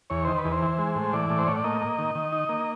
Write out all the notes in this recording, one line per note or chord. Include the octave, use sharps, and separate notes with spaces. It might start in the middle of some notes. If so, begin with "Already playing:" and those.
E2 C#5
D#3 C5
B4
E2
C5
E3
G#3
A2
E3 D5
A2
C5
A2 C#5
D5
A#3 D#5
A#3
D#3
D#3
D#4
A#3